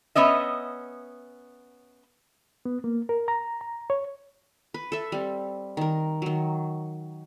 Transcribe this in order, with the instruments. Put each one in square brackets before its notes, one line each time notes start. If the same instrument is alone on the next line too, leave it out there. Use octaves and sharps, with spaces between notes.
[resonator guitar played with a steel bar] B3 C#4 D#5 E5
[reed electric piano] B3
A#3
A#4
A#5
A#5
C#5
[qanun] B4
A4 E5
G3 C4
D#3 A#4
D#3 F#3